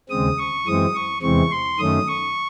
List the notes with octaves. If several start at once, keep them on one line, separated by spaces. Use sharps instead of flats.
D#2 C#3 G#3 C4 D#6
C#6
F#2 E3 G#3 C4 D#6
C#6
E2 C3 E3 G#3 C4 C#6
C6
F#2 D#3 A3 C#4 D#6
C#6